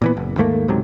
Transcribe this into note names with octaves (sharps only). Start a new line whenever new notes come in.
A#2 E3 B3
F#1
D#2 G#2 A3 A#3
C#2 G#2 C3 F#3